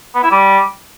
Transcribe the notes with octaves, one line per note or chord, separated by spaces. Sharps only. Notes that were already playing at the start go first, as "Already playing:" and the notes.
B3
E4
G3